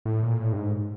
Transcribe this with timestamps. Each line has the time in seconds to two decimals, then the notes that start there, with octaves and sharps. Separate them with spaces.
0.05 A2
0.23 A#2
0.40 A2
0.53 G2
0.56 G#2